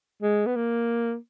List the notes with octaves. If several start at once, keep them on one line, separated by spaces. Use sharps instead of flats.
G#3
B3
A#3